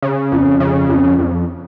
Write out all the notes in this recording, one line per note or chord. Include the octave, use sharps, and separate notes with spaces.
C#3
F2
C#3
F2
F2